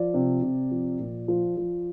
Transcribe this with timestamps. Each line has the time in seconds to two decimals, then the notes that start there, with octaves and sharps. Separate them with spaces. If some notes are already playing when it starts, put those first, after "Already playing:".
Already playing: F3 D5
0.14 C3
0.42 C3
0.71 F3
1.00 A#2
1.28 F3
1.57 F3